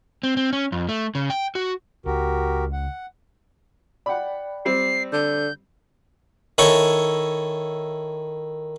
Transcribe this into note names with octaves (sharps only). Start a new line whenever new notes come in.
C4
C4
C#4
F2
A3
C#3
G5
F#4
C#2 F#4 G4 A#4
F#5
D5 F#5 G5 B5
G3 C4 G4 C7
D3 G6
D#3 E4 A4 C#5 C#6